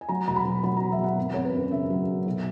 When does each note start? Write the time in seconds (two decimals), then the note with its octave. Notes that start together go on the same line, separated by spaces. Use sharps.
0.01 G#5
0.09 F#3 A#5
0.27 E1 A#5
0.36 B5
0.45 F#3
0.63 F#3 B5
0.77 E2 A#5
0.92 E5
1.00 E2 F#5
1.18 G#1
1.34 G#1 C#5
1.45 B4
1.54 F#2
1.72 C#3 E5
1.90 F#3
2.08 F#2
2.26 B1